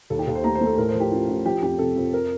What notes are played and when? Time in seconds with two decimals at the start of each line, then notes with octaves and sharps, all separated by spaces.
0.10 D#2 A4
0.19 G4
0.27 D#2 A4
0.35 C5
0.44 A3 A#5
0.55 C5
0.61 A3
0.67 A4
0.77 A2 A#4
0.89 C5
0.95 F3
1.00 G4
1.11 A1 F4
1.28 A1
1.46 F3 G4
1.62 F2 G4
1.79 C3 A4
1.96 F2
2.13 A#4